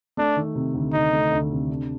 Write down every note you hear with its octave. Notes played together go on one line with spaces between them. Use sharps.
A3 D4
D#3
C3
D2
C3 D#4
A3
D2
C3
D4